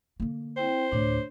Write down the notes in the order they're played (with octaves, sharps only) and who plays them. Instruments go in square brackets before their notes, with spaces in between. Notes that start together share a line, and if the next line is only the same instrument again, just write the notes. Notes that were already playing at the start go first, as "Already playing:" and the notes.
[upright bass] D3 A#3
[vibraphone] C4 E4 G5 [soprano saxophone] C5
[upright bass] D2 A2 [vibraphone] D4 C#5